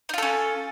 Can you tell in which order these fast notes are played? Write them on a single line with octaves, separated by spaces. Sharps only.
D#4 F4 A4 C#4